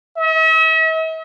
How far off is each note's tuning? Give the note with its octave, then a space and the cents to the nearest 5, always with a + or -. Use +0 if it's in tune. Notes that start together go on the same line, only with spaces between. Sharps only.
E5 -45